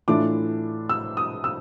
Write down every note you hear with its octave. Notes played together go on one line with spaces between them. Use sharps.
A2 E3 A3 D4 F4 D6
E6
D#6
E6